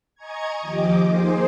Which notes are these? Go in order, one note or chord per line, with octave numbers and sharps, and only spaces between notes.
D#5 G#5 A#5 C#6 G#6
D#2 F3 G4 D#5 D6
A#3 D#4 G#4 C5